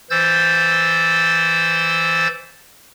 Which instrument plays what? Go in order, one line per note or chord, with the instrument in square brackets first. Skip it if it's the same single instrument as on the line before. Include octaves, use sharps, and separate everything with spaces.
[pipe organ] E3 C5 E6 G6 A6